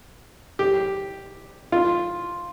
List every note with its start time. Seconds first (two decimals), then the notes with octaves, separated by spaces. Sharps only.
0.59 G4
1.72 F4